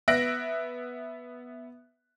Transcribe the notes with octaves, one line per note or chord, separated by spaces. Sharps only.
B3 E5 F#6 A#6 D7